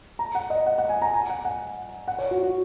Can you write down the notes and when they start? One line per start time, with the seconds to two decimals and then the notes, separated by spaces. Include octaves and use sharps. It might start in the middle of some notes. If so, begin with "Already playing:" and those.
0.19 A#5
0.35 F#5
0.50 D#5
0.66 F#5
0.78 F#5
0.89 G#5
1.02 A#5
1.14 G#5
1.30 F#5
1.45 F#5
2.08 F#5
2.18 C#5
2.31 F#4
2.43 F#4